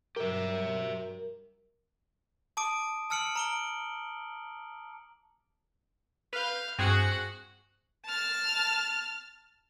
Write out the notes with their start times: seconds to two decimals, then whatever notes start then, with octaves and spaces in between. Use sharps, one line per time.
0.16 G2 F#3 G3 G4 A#4 E5
2.57 A5 D6 D#6 D7
3.10 A5 E6 F6 C#7 D7 F#7
3.36 A#5 D7 G7
6.33 B4 F5 G6
6.79 G2 C4 F#4 G#4 F#5
8.06 A5 F6